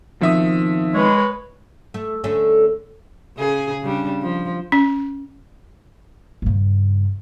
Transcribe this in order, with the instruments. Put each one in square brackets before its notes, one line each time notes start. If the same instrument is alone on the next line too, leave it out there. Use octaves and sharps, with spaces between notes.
[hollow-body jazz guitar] B2 D#3 C4 [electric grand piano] F3 E5 D#6
[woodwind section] G#3 [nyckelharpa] B4 C#5
[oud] A3
D3 A3 C#4
[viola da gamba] C#3 G#4
C#3 G3 D4
F3
[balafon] C#4
[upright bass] G2 C#3